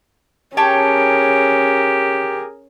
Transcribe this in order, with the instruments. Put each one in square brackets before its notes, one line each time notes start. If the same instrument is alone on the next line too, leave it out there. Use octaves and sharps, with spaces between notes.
[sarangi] C#4 [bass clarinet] G4 [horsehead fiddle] G#4 A#4 [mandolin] C#5 G5 A5